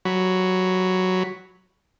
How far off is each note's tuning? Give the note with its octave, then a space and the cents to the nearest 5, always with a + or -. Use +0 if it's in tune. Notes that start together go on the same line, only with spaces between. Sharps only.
F#3 +0 B5 +0